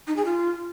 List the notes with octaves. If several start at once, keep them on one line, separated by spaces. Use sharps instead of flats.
D#4
G#4
F4